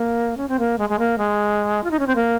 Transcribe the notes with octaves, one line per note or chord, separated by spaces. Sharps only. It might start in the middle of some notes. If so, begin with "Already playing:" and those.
Already playing: A#3
C#4
C4
A#3
G#3
G#3
A#3
G#3
F4
D#4
C#4
C4
A#3